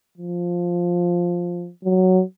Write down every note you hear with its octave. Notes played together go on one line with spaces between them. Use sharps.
F3
F#3